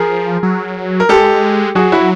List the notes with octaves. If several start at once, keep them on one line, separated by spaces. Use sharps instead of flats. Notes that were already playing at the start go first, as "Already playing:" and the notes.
Already playing: F3 G#4 A#4
F#3
A#4
G#3 G4 A4
F#3 F#4 G#4
E4 F#4